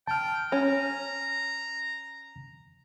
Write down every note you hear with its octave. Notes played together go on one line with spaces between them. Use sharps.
G5 A5 F6
C#4 A#5